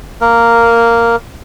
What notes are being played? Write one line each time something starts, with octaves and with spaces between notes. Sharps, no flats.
A#3 A#4